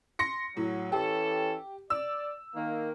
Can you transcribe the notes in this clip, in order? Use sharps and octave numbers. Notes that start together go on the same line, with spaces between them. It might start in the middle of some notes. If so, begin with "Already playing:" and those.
C6 A#6 C#7
A2 F#3
E3 C#4 G4 A4
D5 E6
D#3 A#3